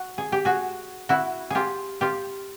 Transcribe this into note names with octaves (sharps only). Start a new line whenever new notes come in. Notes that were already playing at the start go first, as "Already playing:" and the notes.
Already playing: F#4
G#4
G4
F#4 G#4
E4 F#4
F4 G4 G#4
F4 G4